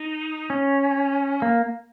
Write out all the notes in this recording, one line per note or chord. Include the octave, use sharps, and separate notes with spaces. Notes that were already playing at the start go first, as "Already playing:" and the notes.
Already playing: D#4
C#4
A#3